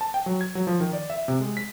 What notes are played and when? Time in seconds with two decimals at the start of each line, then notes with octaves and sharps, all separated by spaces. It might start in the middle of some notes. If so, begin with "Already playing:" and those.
0.01 A5
0.14 G5
0.26 F#3
0.41 G#6
0.55 F#3
0.67 F3
0.80 D#3
0.93 D5
1.10 E5
1.28 C3
1.40 G#3
1.57 B6